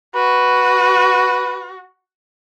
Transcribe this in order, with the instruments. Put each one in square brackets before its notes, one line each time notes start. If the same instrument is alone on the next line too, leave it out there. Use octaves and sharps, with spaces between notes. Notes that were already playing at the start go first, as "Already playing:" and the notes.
[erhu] F#4 [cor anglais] B4